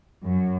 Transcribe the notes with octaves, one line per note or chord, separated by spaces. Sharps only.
F#2